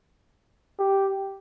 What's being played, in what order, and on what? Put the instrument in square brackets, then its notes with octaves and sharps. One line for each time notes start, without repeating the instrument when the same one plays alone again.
[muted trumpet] G4